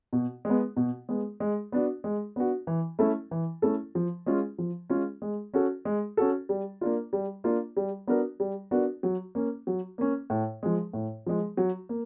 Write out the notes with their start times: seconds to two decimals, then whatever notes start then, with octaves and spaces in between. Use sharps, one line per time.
0.13 B2
0.45 G#3 B3
0.77 B2
1.09 G#3 B3
1.40 G#3
1.72 B3 D4 F#4
2.04 G#3
2.36 B3 D4 F#4
2.67 E3
2.99 A3 C#4 E4 A4
3.31 E3
3.62 A3 C#4 E4 A4
3.95 F3
4.26 G#3 C#4 F4
4.58 F3
4.90 G#3 C#4 F4
5.22 G#3
5.54 C#4 F#4 A4
5.85 G#3
6.17 C#4 F#4 A4
6.49 G3
6.81 A#3 D4 F4
7.13 G3
7.44 A#3 D4 F4
7.77 G3
8.08 B3 D4 F#4 A#4
8.40 G3
8.71 B3 D4 F#4 A#4
9.03 F#3
9.35 A#3 C#4
9.67 F#3
9.98 A#3 C#4
10.30 A2
10.63 F3 G#3
10.93 A2
11.26 F3 G#3
11.57 F#3
11.89 A#3